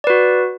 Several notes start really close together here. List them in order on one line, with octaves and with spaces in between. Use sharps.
D5 B4 F#4